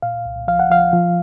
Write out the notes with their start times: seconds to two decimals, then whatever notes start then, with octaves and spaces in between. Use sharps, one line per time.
0.02 A#2 F5
0.26 C2
0.48 F3 F5
0.60 F#5
0.70 F3 F5
0.93 F3